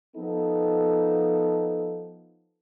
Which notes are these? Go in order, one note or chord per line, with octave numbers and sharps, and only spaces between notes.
F3 B3 D#4 A4